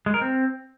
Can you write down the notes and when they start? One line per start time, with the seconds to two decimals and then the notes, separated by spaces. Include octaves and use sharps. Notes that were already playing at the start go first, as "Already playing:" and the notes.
0.06 G#3
0.14 A#4
0.21 C4